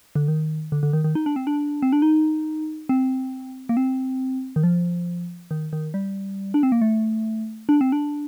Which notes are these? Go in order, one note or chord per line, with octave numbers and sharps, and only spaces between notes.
D3
D#3
D3
D3
D#3
D#3
D#4
D4
C4
D4
C4
D4
D#4
C4
A#3
C4
D#3
F3
D#3
D#3
G3
D4
C4
A#3
A3
D4
C4
D4